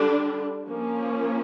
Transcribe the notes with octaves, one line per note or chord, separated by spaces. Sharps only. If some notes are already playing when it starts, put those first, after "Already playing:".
Already playing: D3 G3 D4
F3 A#3 C#4